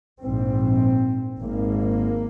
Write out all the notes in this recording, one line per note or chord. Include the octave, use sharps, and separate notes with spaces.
A#1 G#2 C4
G#1 G#2 A#3